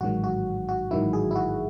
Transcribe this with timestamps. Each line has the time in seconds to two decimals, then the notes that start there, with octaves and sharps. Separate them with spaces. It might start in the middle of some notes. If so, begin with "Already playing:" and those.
0.01 A1 G#2 D#3 F#3 F#4
0.24 F#4
0.69 F#4
0.91 A1 G#2 D#3 F#3 E4
1.13 G#4
1.31 E4
1.36 F#4